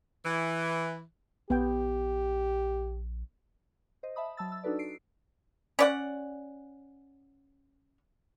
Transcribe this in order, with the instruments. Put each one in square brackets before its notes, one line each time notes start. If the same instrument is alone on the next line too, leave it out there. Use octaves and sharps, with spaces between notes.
[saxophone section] E3
[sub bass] A#1 [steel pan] B3 G5 [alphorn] G4
[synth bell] C5 D#5
E5 A5 B5 D#6
F#3 A5 E6 A6
E6
D4 D#4 F#4 A4 B4 D5
C7 D7
[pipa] C#4 D5 F#5